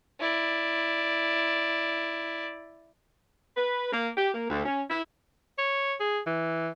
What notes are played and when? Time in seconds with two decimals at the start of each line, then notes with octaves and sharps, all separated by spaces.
0.20 E4 D5
3.57 B4
3.92 A#3
4.17 G4
4.35 A#3
4.50 D2
4.66 C#4
4.90 E4
5.58 C#5
6.00 G#4
6.26 E3